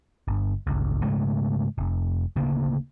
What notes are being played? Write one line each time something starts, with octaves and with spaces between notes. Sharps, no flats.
G1
G1 C#2
G#2 C#3 G#3 A3
F1
D1 D2 C#3 A#3